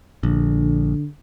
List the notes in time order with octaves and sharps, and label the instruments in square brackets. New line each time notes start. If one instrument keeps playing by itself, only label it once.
[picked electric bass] A#1 [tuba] D3